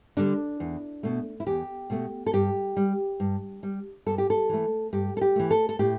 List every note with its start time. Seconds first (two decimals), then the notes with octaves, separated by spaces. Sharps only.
0.17 D3 G3 D4
0.60 E2
1.03 B2 A3
1.40 E4
1.47 E2 G4
1.90 B2 A3
2.26 A4
2.33 G2 G4
2.77 G3
3.20 G2
3.63 G3
4.06 G2 A4
4.18 G4
4.30 A4
4.49 E3 A3
4.93 G2 G4
5.17 A4
5.21 G4
5.36 E3 A3
5.51 A4
5.69 A4
5.79 A2 G4